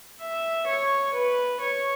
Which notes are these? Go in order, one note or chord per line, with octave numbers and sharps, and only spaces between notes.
E5
C#5
B4
C#5